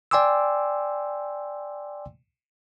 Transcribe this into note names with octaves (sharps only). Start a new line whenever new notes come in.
D5 G5 G#5 C6 D6 E6